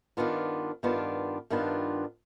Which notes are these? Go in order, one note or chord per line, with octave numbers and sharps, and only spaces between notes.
G2 D#3 B3 D4 F4
G2 D#3 B3 D4 F4
G2 D#3 B3 D4 F4